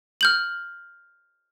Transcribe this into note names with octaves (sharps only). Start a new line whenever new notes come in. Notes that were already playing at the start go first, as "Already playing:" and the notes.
F6 G6 F#7